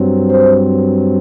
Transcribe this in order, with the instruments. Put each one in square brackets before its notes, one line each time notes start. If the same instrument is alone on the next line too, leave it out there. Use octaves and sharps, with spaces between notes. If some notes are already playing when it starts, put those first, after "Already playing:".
Already playing: [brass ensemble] G2 F#3 C4
C5